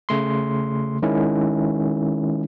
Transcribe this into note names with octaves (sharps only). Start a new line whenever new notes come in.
C#3 A3 C6
D#3 G#3 C#4 E4